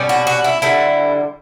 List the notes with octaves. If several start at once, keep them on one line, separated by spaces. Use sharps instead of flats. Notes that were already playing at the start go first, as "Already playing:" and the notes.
Already playing: B2 G3 C#4
F#4
F#4
E4
D3 G3 E4